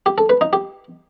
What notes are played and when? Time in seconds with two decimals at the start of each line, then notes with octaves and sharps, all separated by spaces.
0.06 G4
0.18 A4
0.29 B4
0.41 D#4
0.53 G4